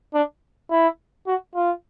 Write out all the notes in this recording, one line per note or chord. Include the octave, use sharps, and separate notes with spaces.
D4
E4
F#4
F4